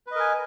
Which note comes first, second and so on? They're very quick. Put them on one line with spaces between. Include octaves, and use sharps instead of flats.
B4 D#5 A#4 G#5